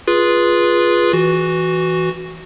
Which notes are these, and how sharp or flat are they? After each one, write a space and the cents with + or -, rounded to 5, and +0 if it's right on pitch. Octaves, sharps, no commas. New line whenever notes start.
F4 +0 G#4 +0 B4 -15
E3 +0 F#4 +0